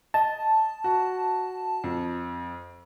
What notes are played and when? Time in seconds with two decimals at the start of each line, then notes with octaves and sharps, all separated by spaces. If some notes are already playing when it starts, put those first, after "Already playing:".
0.14 D#5 A5
0.84 F#4
1.84 F2